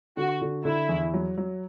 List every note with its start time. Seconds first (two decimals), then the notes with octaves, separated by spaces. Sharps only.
0.17 D3 F#4
0.42 D3
0.65 D3 E4
0.89 E2
1.14 F#3
1.38 F#3